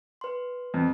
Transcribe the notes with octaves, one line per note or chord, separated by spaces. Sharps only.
B4 C6
F2